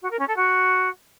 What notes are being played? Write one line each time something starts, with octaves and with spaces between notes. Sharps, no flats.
F#4
A#4
C#4
A4
F#4